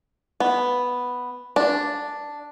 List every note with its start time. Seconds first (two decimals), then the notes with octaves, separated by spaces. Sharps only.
0.40 B3
1.56 D4